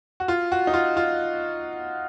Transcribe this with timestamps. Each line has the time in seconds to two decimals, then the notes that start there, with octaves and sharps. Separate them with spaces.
0.20 F#4
0.28 F4
0.52 F#4
0.67 D#4
0.74 F4
0.97 F4